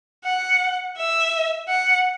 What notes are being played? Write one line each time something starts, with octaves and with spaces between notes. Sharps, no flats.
F#5
E5
F#5